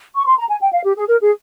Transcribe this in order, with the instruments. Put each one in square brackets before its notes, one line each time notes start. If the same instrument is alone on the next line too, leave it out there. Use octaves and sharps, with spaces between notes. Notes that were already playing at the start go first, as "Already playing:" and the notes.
[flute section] C#6
C6
A#5
G#5
G5
F5
G4
G#4
A#4
G#4